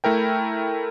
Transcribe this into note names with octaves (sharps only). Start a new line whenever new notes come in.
A3 E4 A#4 G5